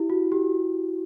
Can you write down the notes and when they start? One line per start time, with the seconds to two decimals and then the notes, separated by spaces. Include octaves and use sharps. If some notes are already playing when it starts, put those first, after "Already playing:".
Already playing: E4 G4
0.10 F#4
0.32 G4